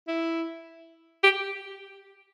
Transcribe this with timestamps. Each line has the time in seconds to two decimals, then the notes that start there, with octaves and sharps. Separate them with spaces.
0.08 E4
1.23 G4